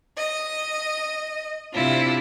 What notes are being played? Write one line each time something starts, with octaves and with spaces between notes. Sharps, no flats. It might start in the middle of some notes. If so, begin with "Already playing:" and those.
D#5
C3 C4 D4 E4 F4